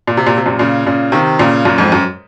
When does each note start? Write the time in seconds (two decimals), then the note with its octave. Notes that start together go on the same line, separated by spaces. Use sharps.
0.07 A#2
0.17 C3
0.26 A#2
0.37 C3
0.46 F#2 A#2
0.59 A#2 C#3
0.86 A#2 C#3
1.12 C3 D#3
1.39 A#2 C#3
1.65 F#2 A#2
1.78 F2 G#2
1.92 F#2